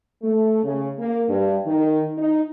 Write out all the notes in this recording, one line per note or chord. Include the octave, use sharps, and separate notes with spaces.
A3
C#3
A#3
G2
D#3
D#4